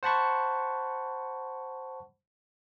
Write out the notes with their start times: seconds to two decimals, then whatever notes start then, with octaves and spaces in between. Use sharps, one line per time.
0.03 C5 F#5 A5 B5 C#6